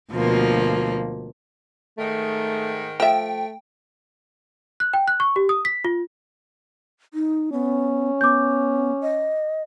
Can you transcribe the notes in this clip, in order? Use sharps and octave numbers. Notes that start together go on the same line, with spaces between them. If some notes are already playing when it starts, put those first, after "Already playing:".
D2 B2 F3 A#3
G#2 D#3 A3
F3 A3 E5 G5
F#6
G5
F#6
C#6
G4
D#6
B6
F4
D#4
B3 C#4
B3 D6 G6
D#5